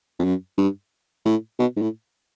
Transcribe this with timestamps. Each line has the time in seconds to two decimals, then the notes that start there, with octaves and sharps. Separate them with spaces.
0.19 F2
0.24 F#2
0.58 G2
1.25 A2
1.59 B2
1.77 G#2
1.82 A2